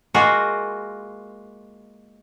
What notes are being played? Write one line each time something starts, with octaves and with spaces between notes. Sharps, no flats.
G#3 A#3 F4 F#4